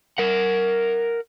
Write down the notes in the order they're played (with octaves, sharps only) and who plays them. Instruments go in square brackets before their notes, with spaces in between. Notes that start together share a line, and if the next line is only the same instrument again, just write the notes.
[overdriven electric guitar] A#4 F#5